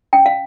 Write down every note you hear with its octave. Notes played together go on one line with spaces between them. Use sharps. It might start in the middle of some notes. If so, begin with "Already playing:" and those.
C#4 G5
F5